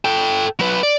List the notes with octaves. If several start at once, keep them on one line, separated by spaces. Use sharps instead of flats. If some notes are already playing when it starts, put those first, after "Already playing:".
A4 G5
F#3 B4
D5